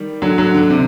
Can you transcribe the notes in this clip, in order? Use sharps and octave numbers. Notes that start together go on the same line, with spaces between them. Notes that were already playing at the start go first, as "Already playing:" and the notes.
Already playing: D#3 G3
D3 F#3
D3 F#3
D3
C3